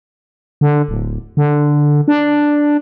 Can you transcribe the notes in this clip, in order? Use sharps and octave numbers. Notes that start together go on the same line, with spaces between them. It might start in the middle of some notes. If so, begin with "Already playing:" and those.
D3
D1
D3
D4